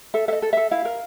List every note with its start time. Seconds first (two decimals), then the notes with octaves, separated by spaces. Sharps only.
0.14 A4 E5
0.28 A4 E5
0.33 D#5
0.42 A4
0.53 A4 E5
0.71 E4 F5
0.85 A#4